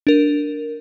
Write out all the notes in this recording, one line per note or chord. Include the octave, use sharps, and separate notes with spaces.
D4 A#4